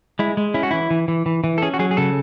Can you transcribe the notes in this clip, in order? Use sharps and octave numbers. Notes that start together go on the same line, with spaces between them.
G#3 E4
G#3
C#4 E4
F#4
E3 E4
E3
E3
E3
E3
A4
C#4 G#4
F#4
F#3 G#4
G#4
C#3 A4